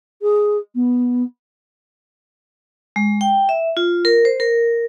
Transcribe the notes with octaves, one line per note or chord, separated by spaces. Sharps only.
G#4
B3
G#3
G5
E5
F4
A#4
C5
A#4